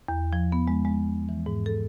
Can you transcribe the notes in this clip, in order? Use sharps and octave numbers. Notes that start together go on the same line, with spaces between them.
E2
F3
B3
G#3
G#3
E3
G#2
A4